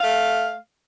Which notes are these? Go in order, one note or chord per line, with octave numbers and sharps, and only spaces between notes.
A3 F5